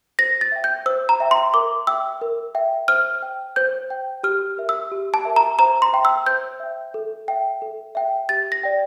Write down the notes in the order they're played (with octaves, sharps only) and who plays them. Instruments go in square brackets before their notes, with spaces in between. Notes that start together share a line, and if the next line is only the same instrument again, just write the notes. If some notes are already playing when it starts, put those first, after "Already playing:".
[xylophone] C5 A#6
A6
E5 G5
G6
C5 E6
A#5
E5 G5
C6
A#4 D6
E5 G5 E6
A#4
E5 G5
C5 F6
G5
C5 G6
G5
G4 F6
A#4 E5
E6
G4
A5
A#4 E5
A#5
C5 A#5
C6
E5 G5
E6
C5 G6
E5 G5
A4
E5 G5
A4
E5 G5
G4 A6
A#6
D5 G5